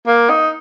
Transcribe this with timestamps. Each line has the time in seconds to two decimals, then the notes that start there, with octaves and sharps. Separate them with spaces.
0.07 A#3
0.30 D#4